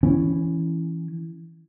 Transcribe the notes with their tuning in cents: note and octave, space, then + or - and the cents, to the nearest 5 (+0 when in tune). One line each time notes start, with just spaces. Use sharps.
E3 +0 C#4 +0